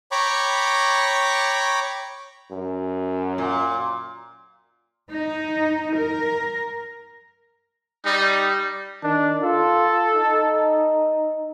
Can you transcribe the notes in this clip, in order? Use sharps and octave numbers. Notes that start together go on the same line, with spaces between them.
C#5 G5 A#5 B5 C#6 D6
F#2
A#2
D#4
A#4
G3 D#4
D#3 D4
F4 A4
D#4